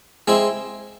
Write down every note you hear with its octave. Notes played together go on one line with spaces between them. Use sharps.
G#3 C4 E4